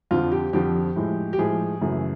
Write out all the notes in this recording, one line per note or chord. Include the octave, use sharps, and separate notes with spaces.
F2 D3 F3 F4
G4
F2 D3 F3 G4
A2 F3 G#3
G4
A2 F3 G#3 G#4
F#2 C#3 E3 A3